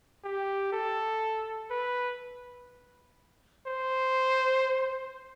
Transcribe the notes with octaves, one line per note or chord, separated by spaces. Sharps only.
G4
A4
B4
C5